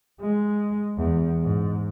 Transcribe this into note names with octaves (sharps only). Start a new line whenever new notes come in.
G#3
E2
G#2